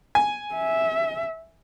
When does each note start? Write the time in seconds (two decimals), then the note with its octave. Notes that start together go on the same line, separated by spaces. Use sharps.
0.15 G#5
0.54 E5